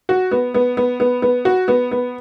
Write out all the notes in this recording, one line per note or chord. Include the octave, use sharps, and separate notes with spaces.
F#4
B3
B3
B3
B3
B3
F#4
B3
B3